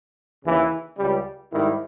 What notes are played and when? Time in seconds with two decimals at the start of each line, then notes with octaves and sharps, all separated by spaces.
0.44 D#2 C#3 E3
0.97 C#2 C#3 G3 G4
1.51 G#2 D#3 G3 E4